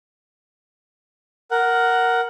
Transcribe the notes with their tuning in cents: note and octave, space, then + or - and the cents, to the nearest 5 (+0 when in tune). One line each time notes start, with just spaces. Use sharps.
A#4 +0 F#5 +5